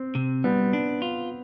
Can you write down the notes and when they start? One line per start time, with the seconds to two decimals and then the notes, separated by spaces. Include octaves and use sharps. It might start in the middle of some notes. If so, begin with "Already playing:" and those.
Already playing: C4
0.15 C3
0.44 G3 B3
0.73 D4
1.02 F4